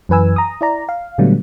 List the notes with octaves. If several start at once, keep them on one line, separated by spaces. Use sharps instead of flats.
F#2 E3 B4 G#5 E6
A#5 D#6
E4 D5 A#5
F5
A#2 D3 F#3 G3 A3 B3